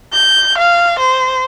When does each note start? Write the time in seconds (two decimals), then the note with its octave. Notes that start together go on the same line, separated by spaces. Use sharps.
0.13 G6
0.59 F5
1.00 C5